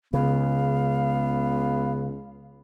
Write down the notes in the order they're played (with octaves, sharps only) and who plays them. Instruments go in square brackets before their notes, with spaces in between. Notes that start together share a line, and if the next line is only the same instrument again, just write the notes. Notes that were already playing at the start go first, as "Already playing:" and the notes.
[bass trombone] C#2 [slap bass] C#3 [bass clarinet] B3 [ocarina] F5